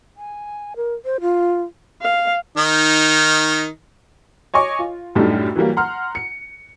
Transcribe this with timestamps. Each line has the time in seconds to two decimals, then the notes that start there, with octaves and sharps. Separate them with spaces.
0.17 G#5
0.76 A#4
1.05 C5
1.21 F4
2.02 F5
2.57 D#3 D#4
4.54 C#5 D#5 G#5 C#6 D6
4.79 F4
5.15 F#2 A2 G3 A3 D4 D#4
5.56 E3 F#3 G3 A#3
5.77 F#5 A#5 C6 F6
6.15 C#7